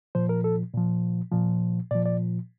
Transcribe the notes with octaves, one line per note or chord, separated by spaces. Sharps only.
A#2 F3 C5
A#4
A4
A#2 F3
A#2 F3
A#2 F3 D5
D5